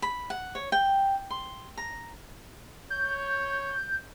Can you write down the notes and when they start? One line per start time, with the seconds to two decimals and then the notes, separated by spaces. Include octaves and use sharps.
0.02 B5
0.30 F#5
0.55 C#5
0.72 G5
1.30 C6
1.77 A#5
2.90 C#5 G6